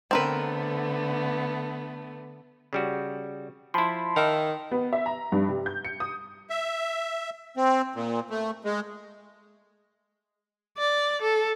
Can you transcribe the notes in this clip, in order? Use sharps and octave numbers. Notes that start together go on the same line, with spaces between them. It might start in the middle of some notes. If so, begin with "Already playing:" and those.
D3 A3 B3 C4 A#4 B4
C#3 G3 F#4
F3 E4 A5 B5 C6
D#3 E5 F5
B3
E5
A#5
G2
C3
G6
C#7
D#6
E5
C4
A#2
A3
G#3
D5
A4